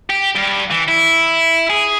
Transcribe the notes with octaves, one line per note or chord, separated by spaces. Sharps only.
G4
G2
E3
E4
G#4